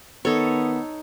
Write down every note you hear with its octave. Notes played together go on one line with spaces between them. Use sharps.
D#3 B3 D#4 A4 C#5